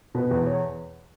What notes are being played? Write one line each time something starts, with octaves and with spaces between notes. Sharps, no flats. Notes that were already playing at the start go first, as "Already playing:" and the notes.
B2 B4
E2
C#5